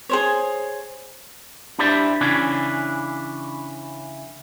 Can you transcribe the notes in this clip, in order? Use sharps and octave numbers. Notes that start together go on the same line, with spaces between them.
G#4 C5 C#5
D4 E4 G4 C5 D5 E5
C#3 E3 C#4 D4 E4